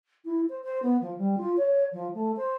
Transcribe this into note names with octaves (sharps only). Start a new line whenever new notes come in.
E4
C5
C5
B3
F3
G3
F4
C#5
F3
A3
C5